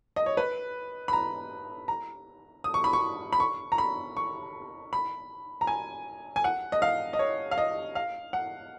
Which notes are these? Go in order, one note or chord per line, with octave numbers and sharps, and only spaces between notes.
D#5
C#5
B4
B5
A#5
A#5
D#6
C#6
B5
C#6
B5
C#6
A#5
B5
C#6
B5
A#5
G#5
G#5
F#5
D#5
F5
D#5
C#5
F5
D#5
F5
F#5